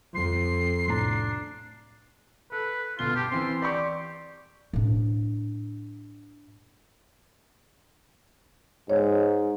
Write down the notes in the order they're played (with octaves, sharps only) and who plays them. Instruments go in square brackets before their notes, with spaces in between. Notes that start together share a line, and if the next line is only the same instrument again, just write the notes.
[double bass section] F2 [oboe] C6 [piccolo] C7
[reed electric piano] C2 A2 A#5 [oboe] D4
[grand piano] A4 [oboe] B4
[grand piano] G1 B2 G7 [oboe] F4
[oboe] G4 [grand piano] A5
[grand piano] E3 C4 [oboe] C6
[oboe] G4 [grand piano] D5 C6 C#6
[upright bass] A2 D4
[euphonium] G#2 [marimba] C#5